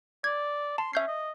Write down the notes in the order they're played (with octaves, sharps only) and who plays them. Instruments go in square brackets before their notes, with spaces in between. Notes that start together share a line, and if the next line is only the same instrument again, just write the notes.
[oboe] D5 [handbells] G#6
[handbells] A5 [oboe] C6
[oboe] C#4 [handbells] E5 G6 C7
[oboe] D#5